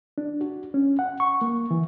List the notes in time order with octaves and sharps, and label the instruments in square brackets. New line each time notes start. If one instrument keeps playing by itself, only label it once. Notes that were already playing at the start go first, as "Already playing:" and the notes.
[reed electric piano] D4
F#4
C#4
F#5
C#6
A#3
E3